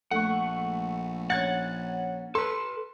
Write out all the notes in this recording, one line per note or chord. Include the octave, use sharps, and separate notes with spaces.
A#1 A3 F#5 C#6
C#4 F#5 G#6 A6
A4 B4 C6